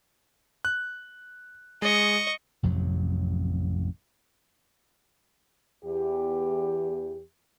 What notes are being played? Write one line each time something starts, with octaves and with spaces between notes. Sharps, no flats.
F#6
G#3 D#5 C#6
A1 F2 C3 F#3
E2 G4